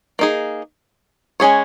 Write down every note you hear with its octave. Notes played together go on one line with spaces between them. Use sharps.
A#3 D#4 G#4
G#3 C#4 G#4 C#5